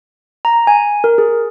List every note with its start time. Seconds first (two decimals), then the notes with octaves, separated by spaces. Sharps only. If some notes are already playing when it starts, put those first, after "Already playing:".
0.45 A#5
0.67 G#5
1.04 A#4
1.18 G#4